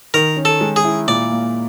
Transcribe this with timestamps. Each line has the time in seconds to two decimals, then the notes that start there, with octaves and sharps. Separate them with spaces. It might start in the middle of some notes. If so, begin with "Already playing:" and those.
0.14 D#3 A#4
0.37 C#4
0.45 A4
0.61 G#3
0.76 G#4
0.85 E4
1.08 A#2 D5
1.32 A#3